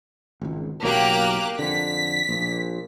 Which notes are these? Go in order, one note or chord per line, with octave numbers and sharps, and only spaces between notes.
G#1 C#2
F#1 B1 F#3 A#3 G4 F#6
F2 D3 B6
A#1 A#2